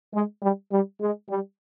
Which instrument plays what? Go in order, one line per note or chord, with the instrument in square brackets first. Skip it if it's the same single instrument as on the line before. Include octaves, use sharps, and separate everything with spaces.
[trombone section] G#3
G3
G3
G#3
G3